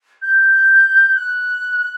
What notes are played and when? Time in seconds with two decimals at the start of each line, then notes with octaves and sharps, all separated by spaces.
0.22 G6
1.15 F#6